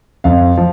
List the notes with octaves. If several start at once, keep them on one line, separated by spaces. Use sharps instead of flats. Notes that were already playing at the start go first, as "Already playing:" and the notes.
F2 F5
F3